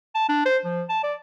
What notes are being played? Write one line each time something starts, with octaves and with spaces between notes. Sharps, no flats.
A5
D4
C5
F3
A5
D5